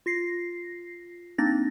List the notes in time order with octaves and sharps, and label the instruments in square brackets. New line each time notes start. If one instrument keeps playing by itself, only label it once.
[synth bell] F4 A#6 C7
A#3 C4 D4 D#4 A6 A#6